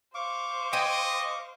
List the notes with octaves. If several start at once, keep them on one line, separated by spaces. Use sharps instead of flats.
C5 F5 C#6 D6
D#5 G5 G#5